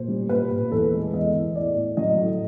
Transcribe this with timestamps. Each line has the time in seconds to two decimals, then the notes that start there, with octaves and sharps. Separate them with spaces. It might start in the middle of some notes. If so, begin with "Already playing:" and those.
Already playing: A#2 C5
0.08 G3
0.29 A#2 B4
0.51 A#2
0.71 E2 A4
0.93 G#3
1.14 E2 D#5
1.34 E2
1.55 A2 D5
1.76 A2
1.97 F#3 D#5
2.18 A2